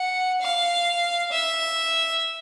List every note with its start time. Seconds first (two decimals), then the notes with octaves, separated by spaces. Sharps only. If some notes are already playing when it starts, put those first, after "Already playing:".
Already playing: F#5
0.41 F5
1.31 E5